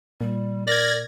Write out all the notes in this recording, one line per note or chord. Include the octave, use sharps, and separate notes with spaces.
A#2 G3
A#4 D5 G#6 A#6